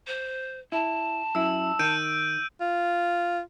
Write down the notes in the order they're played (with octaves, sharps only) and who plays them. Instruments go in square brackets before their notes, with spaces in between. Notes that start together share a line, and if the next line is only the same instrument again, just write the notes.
[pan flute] C5
[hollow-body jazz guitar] E4 [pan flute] A5
[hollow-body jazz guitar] F#2 E4 [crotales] E6
[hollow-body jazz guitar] D#3 [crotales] G6 D7 D#7
[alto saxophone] F4